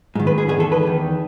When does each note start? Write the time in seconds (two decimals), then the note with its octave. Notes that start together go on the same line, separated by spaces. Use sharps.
0.15 G#2 D#3
0.27 B4
0.38 G#4
0.49 E2 D#3 G#4
0.60 A4
0.72 B4
0.83 E2 D#3